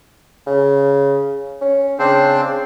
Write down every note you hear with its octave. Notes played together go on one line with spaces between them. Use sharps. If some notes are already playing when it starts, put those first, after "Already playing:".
C#3
C#4
C#3 C4 D4 C5